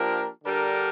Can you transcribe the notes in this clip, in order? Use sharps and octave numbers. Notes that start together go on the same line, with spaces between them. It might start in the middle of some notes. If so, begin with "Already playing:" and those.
Already playing: F3 A#3 D4 G4 A#4
D3 G3 D4 G4 A#4